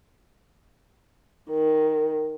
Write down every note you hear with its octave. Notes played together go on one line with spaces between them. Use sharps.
D#3